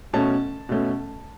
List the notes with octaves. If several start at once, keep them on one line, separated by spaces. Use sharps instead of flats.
B2 A3 C#4 A5
B2 A3 C#4